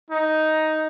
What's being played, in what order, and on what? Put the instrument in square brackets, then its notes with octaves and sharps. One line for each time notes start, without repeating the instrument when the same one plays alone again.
[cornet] D#4